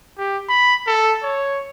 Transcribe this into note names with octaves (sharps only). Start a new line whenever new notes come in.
G4
B5
A4
C#5